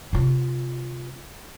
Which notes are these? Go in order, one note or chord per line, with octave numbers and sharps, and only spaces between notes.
C3 F4